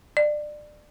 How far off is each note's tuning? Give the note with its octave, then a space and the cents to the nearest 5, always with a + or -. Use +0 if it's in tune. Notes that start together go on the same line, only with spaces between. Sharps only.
D5 +25